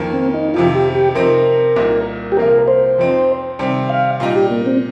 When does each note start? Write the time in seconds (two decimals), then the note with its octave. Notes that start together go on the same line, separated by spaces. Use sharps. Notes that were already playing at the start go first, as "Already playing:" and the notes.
Already playing: F2 D#3 A#3
0.13 C4
0.34 D#4
0.54 F2 C3 D#3 F4
0.75 G4
0.95 G4
1.15 C3 F3 C4 D#4 A#4
1.76 C2 A#2 A#3 D#4
2.32 G4
2.37 C3 F3 A#3 F4 A#4
2.68 C5
2.98 F2 F3 C4 D#4
3.59 C3 D#3 G3 C4
3.90 F5
4.20 A#2 G3 D#4
4.36 G4
4.51 A#3
4.66 C4